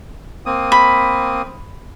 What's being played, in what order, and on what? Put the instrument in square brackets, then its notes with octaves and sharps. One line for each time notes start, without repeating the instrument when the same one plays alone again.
[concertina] A#3 C4 D#6
[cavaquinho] B5